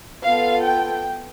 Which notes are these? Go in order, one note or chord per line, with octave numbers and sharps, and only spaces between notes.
B3 F4 A4 F5
G5